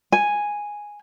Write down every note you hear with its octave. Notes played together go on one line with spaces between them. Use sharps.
G#5